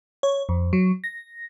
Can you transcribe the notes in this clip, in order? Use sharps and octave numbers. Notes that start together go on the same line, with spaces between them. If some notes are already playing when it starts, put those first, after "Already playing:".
C#5
F2
F#3
A#6